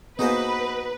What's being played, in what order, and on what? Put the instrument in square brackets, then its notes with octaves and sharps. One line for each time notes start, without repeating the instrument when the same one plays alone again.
[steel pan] A#3 B3 G#4 [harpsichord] D#4 F#4 C5 [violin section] B4